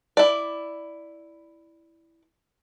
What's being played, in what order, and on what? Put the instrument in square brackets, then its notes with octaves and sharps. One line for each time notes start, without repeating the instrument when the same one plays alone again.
[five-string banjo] E4 D5